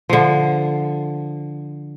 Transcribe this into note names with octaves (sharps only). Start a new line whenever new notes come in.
D3 F3